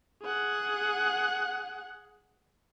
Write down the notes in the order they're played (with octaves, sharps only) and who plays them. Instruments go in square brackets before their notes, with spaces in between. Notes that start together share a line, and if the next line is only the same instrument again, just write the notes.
[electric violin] G#4 F#5